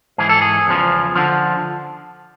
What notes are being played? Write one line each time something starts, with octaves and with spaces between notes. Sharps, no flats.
G#2 E3 G#4
A4
G#4
E2 C#3 F3
D3 F3